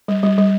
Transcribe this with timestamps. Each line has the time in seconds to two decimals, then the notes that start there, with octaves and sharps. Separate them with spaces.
0.08 G3
0.23 G3
0.38 G3